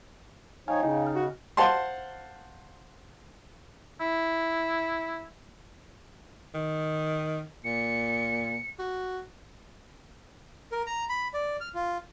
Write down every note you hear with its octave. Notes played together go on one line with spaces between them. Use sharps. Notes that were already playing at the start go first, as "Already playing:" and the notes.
F3 D#4 C#5 F5 G5 G#5
C#3 D#4 F5
D#5 F6
F#4
C5 F5 F#5 A5 C6
E4
D#3
A#2 C#7
F#4
A#4
A#5
B5
D5
F6
F4